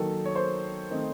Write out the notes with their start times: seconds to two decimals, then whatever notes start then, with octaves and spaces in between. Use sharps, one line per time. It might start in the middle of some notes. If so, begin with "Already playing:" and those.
Already playing: D#3 F#3 A#3 A4
0.25 C#5
0.35 C5
0.90 D#3 A3 C4 D#4